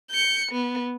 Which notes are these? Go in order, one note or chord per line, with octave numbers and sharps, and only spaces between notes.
G6 C#7
B3